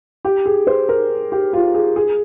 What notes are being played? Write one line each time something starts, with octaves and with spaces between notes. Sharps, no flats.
G4
G#4
C5
A#4
G4
F4
G#4
G#4